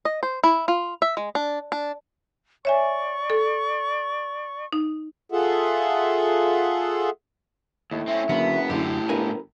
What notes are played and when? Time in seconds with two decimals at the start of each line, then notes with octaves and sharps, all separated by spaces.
0.05 D#5
0.23 C5
0.44 E4
0.68 F4
1.02 E5
1.17 G#3
1.35 D4
1.72 D4
2.65 C#5 D5 E5 G#5 C#6
3.30 A4
4.72 D#4
5.32 F4 G#4 A4 E5 F#5
7.91 D#2 A2
8.07 C4 C#4 E5
8.29 F#1 D3 F#3 A#3 B3
8.70 F#2 A2 D3 E4 G4
9.09 G1 A#4 B4 G#5